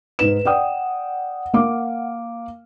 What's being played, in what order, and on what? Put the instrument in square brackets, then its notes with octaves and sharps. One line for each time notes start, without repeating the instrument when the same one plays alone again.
[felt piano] G#2 D#4 E7 [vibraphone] B4
[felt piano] D5 G5 D#6 [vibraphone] F#5
[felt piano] A#3 F5 D6